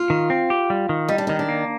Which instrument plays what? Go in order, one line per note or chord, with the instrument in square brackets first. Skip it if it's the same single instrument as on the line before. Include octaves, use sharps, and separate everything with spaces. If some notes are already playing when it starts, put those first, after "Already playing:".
Already playing: [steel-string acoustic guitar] F4
[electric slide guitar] D#3
C4
G4
G3
D#3
[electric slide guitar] G3 [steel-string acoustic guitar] D#4
[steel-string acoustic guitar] D4
[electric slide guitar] D#3 [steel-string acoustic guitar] D#4
[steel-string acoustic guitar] D4
[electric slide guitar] A#3